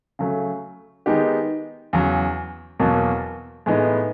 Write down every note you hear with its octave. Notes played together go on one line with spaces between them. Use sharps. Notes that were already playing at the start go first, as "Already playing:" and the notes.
C#3 F#3 A3
D#3 G#3 B3 D#4 G4
E2 C#3 F#3
E2 B2 F#3 A#3
A2 E3 G#3 B3 D#4